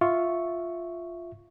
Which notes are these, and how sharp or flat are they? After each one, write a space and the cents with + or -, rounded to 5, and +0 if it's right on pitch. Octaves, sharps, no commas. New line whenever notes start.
F4 +0 E5 +0 C#6 +0